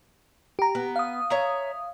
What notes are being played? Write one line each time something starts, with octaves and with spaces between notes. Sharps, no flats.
G4 A#5
B3
F5 D#6
C#5 E5 A#5